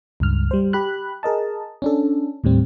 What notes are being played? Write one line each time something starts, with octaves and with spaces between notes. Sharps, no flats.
C#2 G2 F6
G3 C5
G4 B5 F#6
G#4 A#4 D#5 A5
C#4 D4 A4
D#2 A2 G3 C4